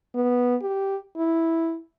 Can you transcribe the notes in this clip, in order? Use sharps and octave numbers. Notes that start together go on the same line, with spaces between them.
B3
G4
E4